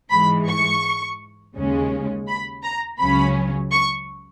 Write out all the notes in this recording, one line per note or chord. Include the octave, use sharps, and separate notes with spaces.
G#2 E3 G#3 B5
C#6
D#2 C#3 G#3 C#4
B5
A#5
C#2 C#3 F#3 C#4 B5
C#6